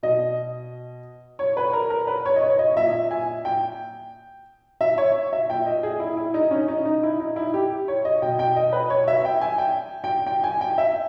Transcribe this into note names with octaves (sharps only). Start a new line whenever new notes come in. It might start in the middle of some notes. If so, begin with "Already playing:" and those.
B2 D#5
C#5
B4
A#4
A#4
B4
C#5
D#5
C#5
D#5
A#2 E5
G#5
G5
E5
C#5
E5
A#2 G5
D#5
G#4
E4
E4
D#4
C#4
D#4
D#4
E4
D#4
E4
G4
C#5
D#5
B2 G5
G5
D#5
B4
C#5
E5
G5
G#5
G5
G5
G5
G#5
G5
E5